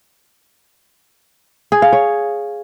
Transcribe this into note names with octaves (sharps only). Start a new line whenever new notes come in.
G#4
F5
C#5